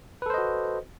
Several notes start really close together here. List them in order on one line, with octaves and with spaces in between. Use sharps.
B4 A4 C5 D#5 F#4